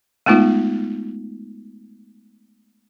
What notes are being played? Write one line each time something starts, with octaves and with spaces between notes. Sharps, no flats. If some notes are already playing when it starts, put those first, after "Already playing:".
G#3 A3 B3 D#4 F4